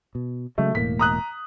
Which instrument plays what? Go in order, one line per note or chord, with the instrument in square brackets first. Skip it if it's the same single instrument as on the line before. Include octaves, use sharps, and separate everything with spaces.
[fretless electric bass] B2
[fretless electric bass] C#3 F#3 G#3 [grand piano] A3
[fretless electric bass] E1 A2 A#3 [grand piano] B6
[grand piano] A#5 D#6 F#6